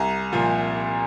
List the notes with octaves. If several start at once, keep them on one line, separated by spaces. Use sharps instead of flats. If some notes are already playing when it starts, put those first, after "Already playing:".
Already playing: C2 G#5 A#5
A#2 F3